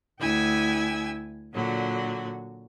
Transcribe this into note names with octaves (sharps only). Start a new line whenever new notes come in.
D2 E4 G5 G#5 E6 G#6
A#2 D3 F#3 F#4